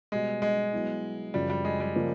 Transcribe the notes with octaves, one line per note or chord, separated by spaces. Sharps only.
B2 G3 G#3 B3
G#3
F#3 B3 E4
F#2 C#3 F3 G3
G3
G#3
G3
C#3 F3 A#3 C#4